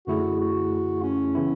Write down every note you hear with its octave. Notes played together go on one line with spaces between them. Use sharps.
F#2 D3 A3 E4 F#4 G#4
F#4
C#4
C#3 E3 B3 E4